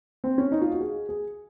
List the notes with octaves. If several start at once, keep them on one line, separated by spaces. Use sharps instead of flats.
C4
C#4
D#4
F4
F#4
G#4
G#4